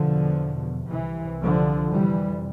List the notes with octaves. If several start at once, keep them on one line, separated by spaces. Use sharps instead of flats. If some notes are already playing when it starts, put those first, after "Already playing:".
Already playing: E2 B2 D3 F3
C2 C3 E3
D3 F3
F2 C3 E3 G3